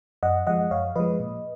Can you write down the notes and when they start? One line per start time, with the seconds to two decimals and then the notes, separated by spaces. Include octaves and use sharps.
0.23 F#2 D#5 F#5
0.47 F3 G#3 D#5 F#5
0.71 F#2 C#5 F5
0.96 F3 G#3 B4 D#5
1.20 A#2